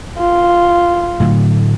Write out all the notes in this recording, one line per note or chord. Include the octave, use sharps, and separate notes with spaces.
F4
A2 D3 F#3